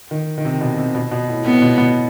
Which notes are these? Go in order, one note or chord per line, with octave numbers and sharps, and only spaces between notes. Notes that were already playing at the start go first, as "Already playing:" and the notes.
D#3
D#3
C3
B2
C3
B2
B2
A2
A2 B3
B2
B2